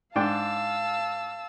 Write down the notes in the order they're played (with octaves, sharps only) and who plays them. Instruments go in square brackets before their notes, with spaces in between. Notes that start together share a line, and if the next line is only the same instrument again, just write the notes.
[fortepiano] G#2 D4 G5 [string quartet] F5 A5 E6